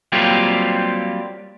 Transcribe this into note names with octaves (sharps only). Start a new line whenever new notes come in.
F#3 G3 A#3 C4 F4 G4